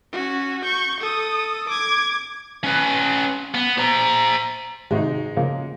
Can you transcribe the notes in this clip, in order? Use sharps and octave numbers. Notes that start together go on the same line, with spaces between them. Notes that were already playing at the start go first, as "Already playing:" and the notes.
C#4 F#4
C#6 G6
A4 D#6
D6 G#6
C#4 B4
B3
C5 A#5
G#1 C3 G#3 D#4 F#4
C#3 F3 A#3